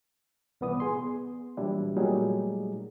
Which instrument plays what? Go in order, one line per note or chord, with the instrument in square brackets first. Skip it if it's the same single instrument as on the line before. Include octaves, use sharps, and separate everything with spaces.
[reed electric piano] C2 A#2 E3 B3 D5 D#6
G#4 C6
B3
A#2 E3 F#3 G3 D4 E4
A#2 F#3 G3 A3 D#4 G#4